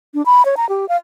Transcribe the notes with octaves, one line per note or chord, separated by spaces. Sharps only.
D4
B5
C#5
A#5
G4
F5